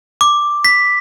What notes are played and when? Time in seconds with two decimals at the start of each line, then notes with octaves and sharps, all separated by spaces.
0.21 D6
0.65 B6